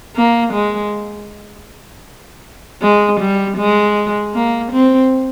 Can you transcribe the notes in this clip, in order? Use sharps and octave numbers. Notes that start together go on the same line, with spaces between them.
A#3
G#3
G#3
G3
G#3
A#3
C4